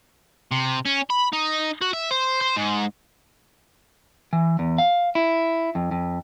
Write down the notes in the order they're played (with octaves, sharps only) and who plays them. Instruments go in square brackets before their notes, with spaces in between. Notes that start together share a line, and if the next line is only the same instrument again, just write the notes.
[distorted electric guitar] C3
C#4
B5
D#4
F#4
E5
C5
C5
G#2
[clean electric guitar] E3
E2
F5
E4
F2
F2